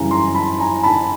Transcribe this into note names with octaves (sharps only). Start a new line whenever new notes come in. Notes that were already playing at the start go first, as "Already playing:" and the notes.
Already playing: F#2 C#3 E3 G3 G#5 A#5
A#5 C6
A5 B5
G#5 A#5
A5 B5